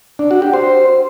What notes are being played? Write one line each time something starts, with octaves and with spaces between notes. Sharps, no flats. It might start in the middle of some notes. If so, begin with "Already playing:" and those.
D4
F#4
G4
C5